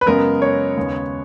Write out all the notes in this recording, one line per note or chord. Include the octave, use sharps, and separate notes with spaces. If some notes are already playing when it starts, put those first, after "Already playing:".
B4
F#2 C#3 G#3 B3 A#4
C#5
D#2 C#3 G#3 B3